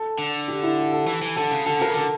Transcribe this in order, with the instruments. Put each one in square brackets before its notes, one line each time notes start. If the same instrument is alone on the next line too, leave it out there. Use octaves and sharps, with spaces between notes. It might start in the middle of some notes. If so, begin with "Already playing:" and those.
Already playing: [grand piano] A4
[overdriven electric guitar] D3
[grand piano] G4
E4
G4
A4
[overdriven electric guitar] E3
E3
[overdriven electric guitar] D3 [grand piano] A4
[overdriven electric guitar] C#3
[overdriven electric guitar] D3 [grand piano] A4
[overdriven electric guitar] C#3 [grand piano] A#4
[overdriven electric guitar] D3 [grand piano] A4